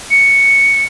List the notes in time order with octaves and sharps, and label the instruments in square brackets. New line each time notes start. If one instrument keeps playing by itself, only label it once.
[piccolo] C#7